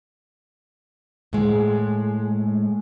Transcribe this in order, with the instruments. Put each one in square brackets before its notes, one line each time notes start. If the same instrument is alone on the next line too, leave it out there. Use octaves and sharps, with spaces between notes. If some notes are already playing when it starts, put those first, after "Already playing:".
[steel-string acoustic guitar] A2 G#3